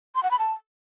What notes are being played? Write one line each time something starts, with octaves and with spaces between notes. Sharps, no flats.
C6
F#5
B5
A5